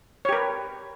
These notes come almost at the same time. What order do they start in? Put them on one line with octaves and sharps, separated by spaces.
C#5 G4 A#4 B4